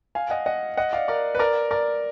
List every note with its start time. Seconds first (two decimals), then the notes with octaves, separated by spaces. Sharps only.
0.15 F5 G#5
0.30 D#5 F#5
0.46 D#5 F#5
0.77 D#5 F#5
0.93 D5 F5
1.08 A#4 D5
1.35 B4
1.39 A#4 D5
1.71 A#4 D5